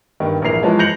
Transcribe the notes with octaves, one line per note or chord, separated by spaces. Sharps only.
G2 D#3
A#1 E3 A#4 C7 F7
E3 F3 G#3 C#5 A5
G6 A#6 C#7 F7 F#7